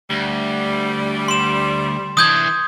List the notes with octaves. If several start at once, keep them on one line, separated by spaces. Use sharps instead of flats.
D2 G3
C6 E7
E3 D4 D#6 G6 G#6